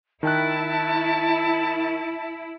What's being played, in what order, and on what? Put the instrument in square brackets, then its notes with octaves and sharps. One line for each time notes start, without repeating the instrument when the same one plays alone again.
[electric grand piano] D#3 G5 F#6 [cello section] E4 [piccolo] A5